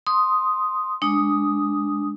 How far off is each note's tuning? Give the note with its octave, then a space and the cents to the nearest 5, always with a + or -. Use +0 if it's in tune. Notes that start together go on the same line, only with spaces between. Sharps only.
C6 +0 D#6 +0
G#3 +0 D4 +0 D#6 +0